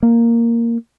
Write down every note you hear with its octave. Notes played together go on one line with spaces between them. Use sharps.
A#3